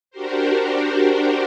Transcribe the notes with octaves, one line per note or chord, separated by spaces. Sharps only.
D4 F#4 G4 A#4 C5